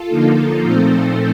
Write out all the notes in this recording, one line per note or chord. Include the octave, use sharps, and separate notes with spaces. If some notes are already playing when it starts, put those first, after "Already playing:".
Already playing: F4 A4
D3 F3 A#3 D#4
A#2 F3 A3 C4 D#4 A4 C5